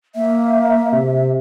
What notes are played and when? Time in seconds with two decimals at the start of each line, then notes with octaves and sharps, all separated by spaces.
0.15 A#3 E5
0.93 C3